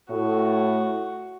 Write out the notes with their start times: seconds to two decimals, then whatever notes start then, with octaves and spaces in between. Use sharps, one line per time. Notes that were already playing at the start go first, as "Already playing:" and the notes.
0.10 A2 F#4